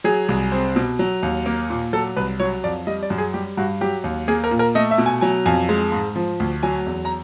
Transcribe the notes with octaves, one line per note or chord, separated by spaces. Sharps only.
F#3 G#4
C2
C4
B2
F#3
D#2
A#3
A#2
F#3 A4
C2 B4
F#3 C#5
F2 D5
G3 D#5
D5
F#2
G#4
G3 G4
G2 F#4
F#3 G4
D#2
A#3 G#4
A#4
A#2
A#4
A3 D#5
E5
B2
G#5
F#3 G#5
F2 G#5
G#3
G#2
F3
D2
F#3 G#5
E2
A#5